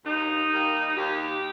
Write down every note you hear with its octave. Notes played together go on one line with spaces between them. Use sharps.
D#2 D#4
D#3 G3 A#3
D#2 G4